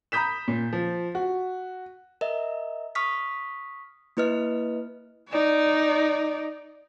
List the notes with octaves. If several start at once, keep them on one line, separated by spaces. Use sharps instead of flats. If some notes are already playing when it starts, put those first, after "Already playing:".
A#5 B5 D#6 G6 B6 E7
A#2
F3
F#4
A#4 D#5 E5
C#6 D#6 F6 B6
A#3 E4 B4 D#5 F6
D#4 D5